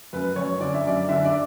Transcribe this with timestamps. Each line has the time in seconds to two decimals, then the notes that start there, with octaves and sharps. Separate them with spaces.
0.13 F#2 B4
0.36 F#2 C#5
0.60 D3 D5
0.74 E5
0.85 F#2 D5
1.09 D3 E5
1.25 D5